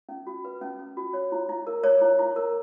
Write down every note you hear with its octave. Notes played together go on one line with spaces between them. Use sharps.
C#4
F#4
B4
C#4
C#4
F#4
C#5
E4
E4
A#4
C#5
E4
E4
A#4